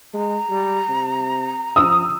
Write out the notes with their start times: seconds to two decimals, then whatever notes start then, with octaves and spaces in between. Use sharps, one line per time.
0.13 G#3 A#5
0.50 G3
0.89 C3
1.76 F3 D#6 E6